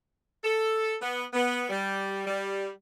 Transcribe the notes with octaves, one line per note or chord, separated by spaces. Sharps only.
A4
B3
B3
G3
G3